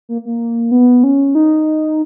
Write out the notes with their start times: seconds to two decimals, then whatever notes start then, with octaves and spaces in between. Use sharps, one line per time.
0.09 A#3
0.25 A#3
0.71 B3
1.04 C#4
1.35 D#4